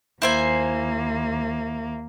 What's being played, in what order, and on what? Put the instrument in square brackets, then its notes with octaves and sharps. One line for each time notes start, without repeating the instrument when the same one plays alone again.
[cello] D#2 A#3 [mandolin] E4 C5 G#5